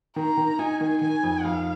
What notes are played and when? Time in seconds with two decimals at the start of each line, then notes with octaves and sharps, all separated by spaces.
0.16 D#3 A#5
0.37 D#3
0.59 D#4 G#5
0.81 D#3
1.01 D#3 G#5
1.23 F2
1.45 F2 F5